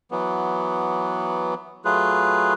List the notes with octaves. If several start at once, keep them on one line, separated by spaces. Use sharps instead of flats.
E3 F#3 B3
F#3 A3 F4 G#4 B4